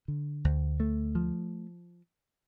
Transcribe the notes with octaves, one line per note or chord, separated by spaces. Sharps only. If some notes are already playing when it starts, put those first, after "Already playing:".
D3
D2
A3
F3